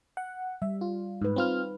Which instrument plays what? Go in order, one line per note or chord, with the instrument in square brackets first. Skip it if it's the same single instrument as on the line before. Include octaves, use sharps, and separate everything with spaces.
[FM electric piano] F#5
[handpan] G3 [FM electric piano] E5
[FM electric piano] F4
[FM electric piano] G#2 [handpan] D#4 B4
[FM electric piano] C4 F4 F6